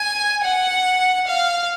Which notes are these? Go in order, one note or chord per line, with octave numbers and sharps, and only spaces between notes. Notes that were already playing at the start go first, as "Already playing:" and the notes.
Already playing: G#5
F#5
F5